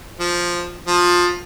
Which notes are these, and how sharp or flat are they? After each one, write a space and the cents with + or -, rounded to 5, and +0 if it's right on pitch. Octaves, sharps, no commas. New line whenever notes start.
F3 +0
F3 +15